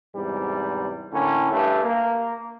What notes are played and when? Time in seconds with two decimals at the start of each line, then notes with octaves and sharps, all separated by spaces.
0.15 E2 G#2 C3 G3
1.12 A2 D3 A#3 C#4
1.52 G2 A3
1.84 A#3